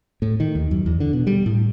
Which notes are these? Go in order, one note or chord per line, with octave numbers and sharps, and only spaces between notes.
A2
D#3
D#2
F#2
E2
D3
B2
G3
A2